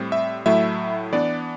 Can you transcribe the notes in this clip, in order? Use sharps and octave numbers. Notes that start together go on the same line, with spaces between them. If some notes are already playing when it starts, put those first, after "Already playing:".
Already playing: A2 G3 C4
E5
A2 F#3 A3 E4 E5
E3 B3 D4 D5